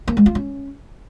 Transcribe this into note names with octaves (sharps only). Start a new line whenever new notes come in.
A#3
G#3
F4
C#4